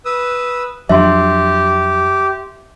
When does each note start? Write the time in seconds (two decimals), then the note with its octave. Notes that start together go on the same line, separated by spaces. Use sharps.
0.05 B4 D#6 E6
0.89 F2 F#3 D4 G4 E5 C6